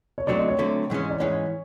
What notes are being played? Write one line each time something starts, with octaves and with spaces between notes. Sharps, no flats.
C#5
D3 F#3 A3 C4 D5
D#5
C#5
D3 F#3 A3 C4
G#2 E3 G#3 C#4
D5
G#2 E3 G#3 C#4 C#5